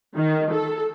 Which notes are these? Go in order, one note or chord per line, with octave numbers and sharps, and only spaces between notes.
D#3
A4